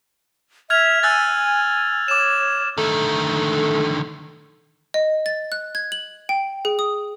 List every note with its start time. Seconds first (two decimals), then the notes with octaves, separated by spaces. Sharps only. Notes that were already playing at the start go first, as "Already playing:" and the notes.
0.70 E5 F6 G#6 F7
1.03 G#5 E6 F#6 A6
2.08 C#5 D6 E7
2.78 D3 D#3 A3
4.94 D#5
5.26 A6
5.52 F#6
5.75 G#6
5.92 F#7
6.29 G5
6.65 G#4
6.79 D#6